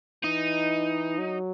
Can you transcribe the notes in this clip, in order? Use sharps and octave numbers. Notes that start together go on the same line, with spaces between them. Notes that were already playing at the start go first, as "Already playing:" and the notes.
E3 D#4
F#3